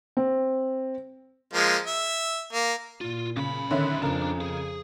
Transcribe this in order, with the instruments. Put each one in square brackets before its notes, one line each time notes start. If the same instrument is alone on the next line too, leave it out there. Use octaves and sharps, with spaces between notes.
[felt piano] C4
[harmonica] F3 G#3 A#3
E5
A#3
[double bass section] A#2 [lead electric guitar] F4
[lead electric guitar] F#2 B5 [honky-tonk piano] C#3
[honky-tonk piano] D3 C#4 E5 [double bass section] D#3
[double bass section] F2 [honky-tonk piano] C#3 A#4 [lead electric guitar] D4
[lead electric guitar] G#4